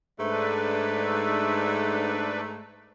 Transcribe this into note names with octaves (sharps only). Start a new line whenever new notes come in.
G#2 A3 D4 B4